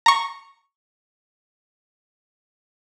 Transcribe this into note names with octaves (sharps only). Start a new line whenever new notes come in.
A#5 C#6